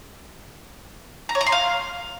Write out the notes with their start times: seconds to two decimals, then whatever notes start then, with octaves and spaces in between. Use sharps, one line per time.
1.29 A#5
1.35 C#5
1.41 A#5
1.47 C6
1.52 F5